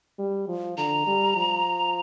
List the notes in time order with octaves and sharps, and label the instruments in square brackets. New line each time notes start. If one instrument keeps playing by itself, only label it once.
[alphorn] G3
F3
[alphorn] D3 [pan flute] A#5
[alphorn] G3
F3